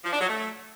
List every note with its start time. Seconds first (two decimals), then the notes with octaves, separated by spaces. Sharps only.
0.05 F3
0.13 D4
0.21 F#3
0.29 A3